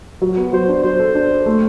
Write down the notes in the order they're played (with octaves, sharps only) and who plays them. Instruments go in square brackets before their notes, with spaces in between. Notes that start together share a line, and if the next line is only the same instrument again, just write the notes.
[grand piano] F#3
B3
[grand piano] F#3 [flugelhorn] C5
[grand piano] D4
[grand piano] F#3 [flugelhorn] C5
[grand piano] A4
D4
A4
A3